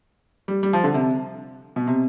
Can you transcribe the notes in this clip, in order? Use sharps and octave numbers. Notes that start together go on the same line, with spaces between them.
G3
G3
F3
D3
C3
B2
C3